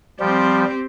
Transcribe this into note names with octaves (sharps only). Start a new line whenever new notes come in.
F3 G3 C4 G4